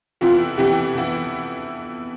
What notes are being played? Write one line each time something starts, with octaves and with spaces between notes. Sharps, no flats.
F2 C3 E3 B3 E4 F4
F2 C3 E3 B3 E4 G4
C3 E3 B3 E4